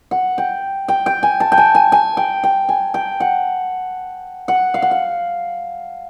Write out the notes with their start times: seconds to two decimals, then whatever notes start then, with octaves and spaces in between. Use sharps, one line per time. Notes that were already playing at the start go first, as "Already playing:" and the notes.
0.11 F#5
0.38 G5
0.88 G5
1.06 G5
1.23 G#5
1.40 A5
1.52 G5
1.58 G#5
1.75 G#5
1.92 G#5
2.17 G5
2.43 G5
2.69 G#5
2.94 G5
3.20 F#5
4.48 F#5
4.74 F5
4.82 F#5
4.91 F5